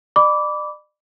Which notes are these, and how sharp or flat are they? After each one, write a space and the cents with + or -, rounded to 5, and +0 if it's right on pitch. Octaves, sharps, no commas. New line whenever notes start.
D5 +40 B5 +0 D6 -15